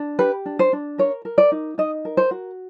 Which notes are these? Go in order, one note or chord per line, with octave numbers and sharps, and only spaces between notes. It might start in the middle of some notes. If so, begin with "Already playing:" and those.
Already playing: D4
G4 B4
D4
C5
D4
A#4 C#5
A#4
D5
D#4
D#4 D#5
A#4
C5
F#4